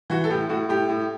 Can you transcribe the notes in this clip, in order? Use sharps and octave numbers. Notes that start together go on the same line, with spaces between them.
E3 F#4
A4
A2 G4
A2 F#4
A2 G4
A2